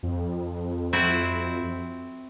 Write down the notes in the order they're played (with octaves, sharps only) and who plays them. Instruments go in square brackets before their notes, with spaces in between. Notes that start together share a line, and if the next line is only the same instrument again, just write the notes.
[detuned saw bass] F2
[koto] C4 E4 F#4